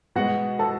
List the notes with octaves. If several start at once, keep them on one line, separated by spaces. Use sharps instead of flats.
B2 G#3 B3 F#4 F#5
A4 A5